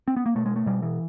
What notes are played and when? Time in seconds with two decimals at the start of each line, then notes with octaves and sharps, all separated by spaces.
0.08 C4
0.16 B3
0.26 A#3
0.35 B2 A3
0.46 G#3
0.56 A3
0.66 B2 G3
0.82 E3